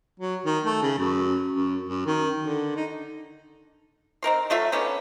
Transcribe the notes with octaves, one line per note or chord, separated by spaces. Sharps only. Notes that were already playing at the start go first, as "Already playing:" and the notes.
F#3
D#3
A3
C#3
F#2
F#2
F#2
D#3
D3
D#4
C4 D#4 A#4 C6
F#3 A3 F4 E5
D3 D#3 B3 C#4